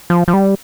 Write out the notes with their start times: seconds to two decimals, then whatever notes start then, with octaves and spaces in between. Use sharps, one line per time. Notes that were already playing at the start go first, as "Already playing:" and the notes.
0.10 F3
0.28 F3
0.33 G3